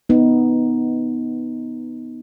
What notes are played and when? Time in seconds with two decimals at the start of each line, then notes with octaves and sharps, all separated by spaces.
0.09 B3 D#4